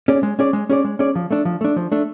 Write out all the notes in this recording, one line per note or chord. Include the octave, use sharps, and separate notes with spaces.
C#4 G#4 D5
G#3
C#4 G#4 D5
G#3
C#4 G#4 D5
G#3
C#4 G#4 D5
F3
A3 D4
F3
A3 D4
F3
A3 D4